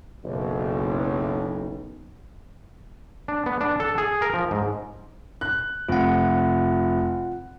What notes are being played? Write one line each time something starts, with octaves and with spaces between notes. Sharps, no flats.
F#1 B1
D4
B3
D4
A4
G#4
A#4
F3
G#2
F#6
F1 F4 F#5